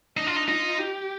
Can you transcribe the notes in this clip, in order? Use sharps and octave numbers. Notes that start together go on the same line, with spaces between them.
D4 D#4
F4
D#4
D#4 F4
G4